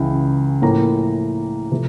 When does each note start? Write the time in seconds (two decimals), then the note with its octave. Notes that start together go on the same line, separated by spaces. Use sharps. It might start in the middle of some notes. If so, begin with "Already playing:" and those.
Already playing: C#2 C#3 E3
0.62 A2 F3 A#3 A#5
1.72 C3 F3 A3